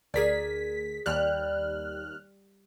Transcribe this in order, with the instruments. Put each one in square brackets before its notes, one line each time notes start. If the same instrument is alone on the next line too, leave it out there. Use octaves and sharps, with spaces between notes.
[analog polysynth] D2 B6 [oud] G#4 A#4 D5
[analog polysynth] D#2 F6 F#6 [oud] G3